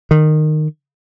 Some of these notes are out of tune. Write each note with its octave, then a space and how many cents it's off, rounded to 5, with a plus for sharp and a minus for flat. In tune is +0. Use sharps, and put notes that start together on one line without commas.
D#3 -20